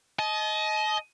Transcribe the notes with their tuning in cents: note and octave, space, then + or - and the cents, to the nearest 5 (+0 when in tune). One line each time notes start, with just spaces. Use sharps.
D#5 +10 A5 -40